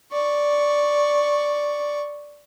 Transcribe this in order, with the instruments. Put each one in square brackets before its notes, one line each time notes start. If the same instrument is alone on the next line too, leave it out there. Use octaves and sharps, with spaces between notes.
[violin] D5 C#6